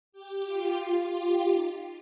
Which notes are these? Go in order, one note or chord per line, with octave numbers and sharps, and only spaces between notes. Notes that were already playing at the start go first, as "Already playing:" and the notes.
G4
F4
F4
G4
D#4